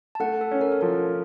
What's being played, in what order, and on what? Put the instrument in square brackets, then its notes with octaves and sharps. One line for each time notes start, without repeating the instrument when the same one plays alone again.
[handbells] A5
[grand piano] A3 [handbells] F#5
[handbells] A4
[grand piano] C#4
[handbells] A#4
A4
[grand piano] F3 [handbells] A#4